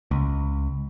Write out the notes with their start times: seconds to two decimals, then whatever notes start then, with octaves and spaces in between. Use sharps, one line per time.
0.11 C#2